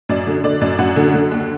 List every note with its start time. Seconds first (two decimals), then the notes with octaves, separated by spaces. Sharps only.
0.09 F#2 D5
0.27 D3
0.44 D3 D5
0.61 F#2 D5
0.78 F#2 F#5
0.96 D3
1.14 D3
1.31 D#2